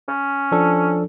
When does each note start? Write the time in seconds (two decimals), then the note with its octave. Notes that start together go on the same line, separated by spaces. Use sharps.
0.08 C#4
0.52 F3 D4 A4